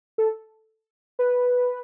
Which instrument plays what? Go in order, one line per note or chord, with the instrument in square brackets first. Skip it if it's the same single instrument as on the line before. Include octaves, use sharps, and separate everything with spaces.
[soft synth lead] A4
B4